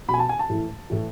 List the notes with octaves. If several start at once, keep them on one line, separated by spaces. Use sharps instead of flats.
B2 B5
G#5
A5
G#5
A5
A2 E3
A2 E3